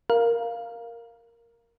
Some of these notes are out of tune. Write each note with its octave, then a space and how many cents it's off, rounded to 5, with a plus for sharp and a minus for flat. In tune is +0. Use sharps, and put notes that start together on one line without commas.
A#4 +0 F5 +0